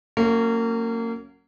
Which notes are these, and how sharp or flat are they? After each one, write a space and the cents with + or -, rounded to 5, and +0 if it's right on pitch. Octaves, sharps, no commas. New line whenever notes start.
F#3 +0 A#3 -30 C#4 +0